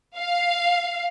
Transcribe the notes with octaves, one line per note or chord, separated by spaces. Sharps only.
F5